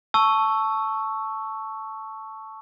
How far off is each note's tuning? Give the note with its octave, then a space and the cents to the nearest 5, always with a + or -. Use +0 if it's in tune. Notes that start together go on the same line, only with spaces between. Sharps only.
A5 +0 C#6 +0 E6 +0